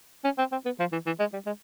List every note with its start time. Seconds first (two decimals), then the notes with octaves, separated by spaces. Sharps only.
0.24 C#4
0.38 C4
0.52 C4
0.65 B3
0.79 F3
0.92 E3
1.06 E3
1.19 G#3
1.33 G3
1.46 G#3